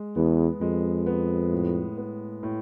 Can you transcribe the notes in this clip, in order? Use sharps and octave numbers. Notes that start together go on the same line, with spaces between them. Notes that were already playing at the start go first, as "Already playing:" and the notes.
Already playing: G#3
E2 B3
F2 G#3
B3
A2
B3
A2